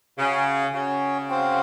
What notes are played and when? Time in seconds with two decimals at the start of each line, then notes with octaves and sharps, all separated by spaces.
0.18 C#3 C#4 F#4 C#5
0.74 C#3 C#4 F#4 C#5
1.29 C4 F#4 C5 F5